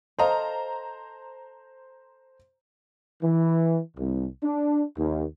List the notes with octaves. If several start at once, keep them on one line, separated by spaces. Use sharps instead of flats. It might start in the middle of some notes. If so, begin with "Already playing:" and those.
A4 C5 D#5 F5 A#5
E3
C2
D4
D#2